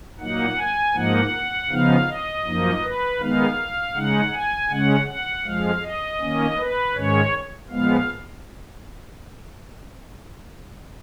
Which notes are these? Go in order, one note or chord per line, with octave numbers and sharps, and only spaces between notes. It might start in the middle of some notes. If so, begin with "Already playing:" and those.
A#2 F#3 A#3 D#4 F#5
G#5
G#2 F3 A#3 D#4 F#5
C#3 F3 B3 D#4 F5
D#5
F#2 F3 A#3 D#4
B4
D#3 G#3 B3 D#4 F5
C#3 G#3 D#4 F#5
G#5
C#3 G#3 C#4 F#5
F#5
F2 F3 G#3 F5
D#5
D#3 A#3 C#4
B4
G#2 D#3 G#3 C#4 C#5
A#2 F3 G#3 B3 F5